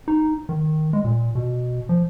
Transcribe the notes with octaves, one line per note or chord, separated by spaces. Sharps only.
D#4
D#3
G#3
A#2
B2
F3